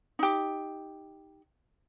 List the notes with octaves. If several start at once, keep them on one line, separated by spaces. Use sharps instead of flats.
D#4 G4